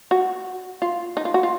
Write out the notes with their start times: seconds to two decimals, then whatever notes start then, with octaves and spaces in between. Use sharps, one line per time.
0.11 F#4
0.82 F4
1.17 D#4
1.25 F4
1.34 F#4
1.43 F4